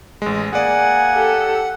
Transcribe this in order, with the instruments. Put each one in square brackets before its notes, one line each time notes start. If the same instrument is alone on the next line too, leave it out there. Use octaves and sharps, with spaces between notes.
[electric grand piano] A1 G#3
[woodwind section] A#3 G#5 [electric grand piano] G#4 D5 [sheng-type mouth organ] F#5
[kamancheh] G4 A4